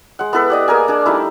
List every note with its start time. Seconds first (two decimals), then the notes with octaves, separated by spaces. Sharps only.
0.19 G#3 F#5
0.33 B3 E4 A4 B4
0.50 G4 D5 D#5
0.68 A#3 G#4 A#4 G#5
0.88 D4 G#4
1.06 G3 A3 D#4 E4